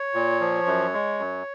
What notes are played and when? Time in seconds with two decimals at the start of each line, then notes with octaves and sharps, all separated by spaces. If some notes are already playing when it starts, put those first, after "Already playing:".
Already playing: C#5
0.14 A#2
0.41 F3
0.66 F#2
0.94 G#3
1.19 F#2